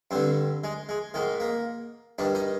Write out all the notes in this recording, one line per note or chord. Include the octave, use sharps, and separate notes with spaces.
G2 D3 C4
G#3
G#3
G#2 D#3 G#3
A#3
G2 D#3 D4
D#4